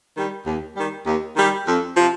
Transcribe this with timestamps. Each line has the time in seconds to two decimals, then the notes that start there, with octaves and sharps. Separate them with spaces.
0.16 D#3 G3
0.46 D#2
0.76 D#3 G3
1.06 D#2
1.37 D#3 G3
1.68 F2
1.96 C3 F3